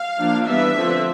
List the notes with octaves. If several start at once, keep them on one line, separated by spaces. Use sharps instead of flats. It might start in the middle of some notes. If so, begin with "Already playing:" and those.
Already playing: F5
F3 A#3 D4
E3 G3 B3 D4 E5
D3 F3 A3 C4